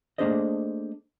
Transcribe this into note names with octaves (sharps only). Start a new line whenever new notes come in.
A3 A#3 D4 G#4 C5 D#5